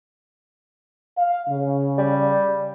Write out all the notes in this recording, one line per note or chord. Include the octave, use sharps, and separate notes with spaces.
F5
C#3
G3